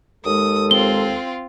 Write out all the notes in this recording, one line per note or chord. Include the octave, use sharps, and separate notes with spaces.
D#2 G#3 A4 D#6
C4 F4 G7